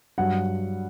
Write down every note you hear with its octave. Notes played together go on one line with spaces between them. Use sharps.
G2 F#3 F#5